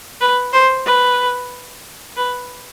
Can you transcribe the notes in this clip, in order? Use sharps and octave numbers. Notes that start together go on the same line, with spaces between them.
B4
C5
B4
B4